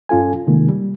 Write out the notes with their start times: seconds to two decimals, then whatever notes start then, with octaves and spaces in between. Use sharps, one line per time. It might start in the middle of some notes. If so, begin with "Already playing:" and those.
0.09 G2 C#4 F4 A4 G#5
0.47 C3 D#3 G#3 A#3
0.69 G3